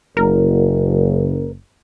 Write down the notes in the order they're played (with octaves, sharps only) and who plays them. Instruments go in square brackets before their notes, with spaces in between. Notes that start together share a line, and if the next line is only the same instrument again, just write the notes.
[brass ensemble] F#1 [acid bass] A#4